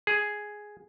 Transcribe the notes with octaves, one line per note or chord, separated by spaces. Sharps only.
G#4